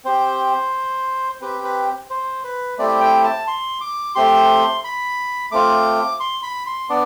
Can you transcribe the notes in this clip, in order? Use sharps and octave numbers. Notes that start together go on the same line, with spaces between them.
C4 G4 C5
C4 G4 B4
B4
C5
B4
A3 C4 E4 G4 D5
G5
A5
C6
D6
A3 C4 G4 C6
B5
A3 C4 F4 D6
C6
B5
C6
B3 D4 D5